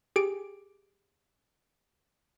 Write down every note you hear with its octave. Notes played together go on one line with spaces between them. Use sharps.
G4 G#4 D7